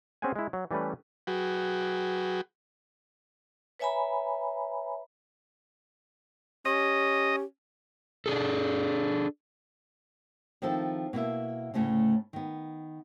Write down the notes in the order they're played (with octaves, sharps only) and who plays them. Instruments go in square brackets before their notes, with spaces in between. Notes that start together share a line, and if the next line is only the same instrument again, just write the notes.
[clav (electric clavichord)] C4 C#4 G#4 C5 F#5 G#5
G#3 E4
F#3
E3 G3 A3 C#4 B4
[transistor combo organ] F#3 F#4 G#4 B4 G5
[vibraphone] B4 C#5 E5 G#5 A#5 B5
[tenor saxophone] C#4 [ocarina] G4 [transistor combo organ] D#5
[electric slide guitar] D4 G#4 A4
[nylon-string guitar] D#3 F3 C4 E4 A4
B2 A#3 E4 E5
D2 A2 C#3 A3
D#3 B3